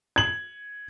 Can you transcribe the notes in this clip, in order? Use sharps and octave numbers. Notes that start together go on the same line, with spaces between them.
G#6 F#7